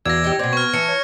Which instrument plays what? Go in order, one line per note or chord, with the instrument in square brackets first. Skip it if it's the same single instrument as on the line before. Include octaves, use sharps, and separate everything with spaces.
[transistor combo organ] E2 D5 E6 [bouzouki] F#3 F5 [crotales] G#6 A#6
[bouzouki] D#4 G4
[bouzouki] B2 C4 [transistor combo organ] D5
[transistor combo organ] B3 [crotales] C#6 F6
[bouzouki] E3 A5 [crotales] C#7
[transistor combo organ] C#5